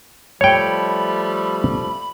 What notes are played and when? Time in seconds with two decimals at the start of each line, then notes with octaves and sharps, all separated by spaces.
0.41 F3 G3 A3 C#5 G5 B5